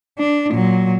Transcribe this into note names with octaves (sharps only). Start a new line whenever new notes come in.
D4
A#2 F#3